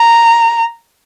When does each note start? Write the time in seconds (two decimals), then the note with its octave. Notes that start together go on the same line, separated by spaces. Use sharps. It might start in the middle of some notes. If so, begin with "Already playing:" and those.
Already playing: A#5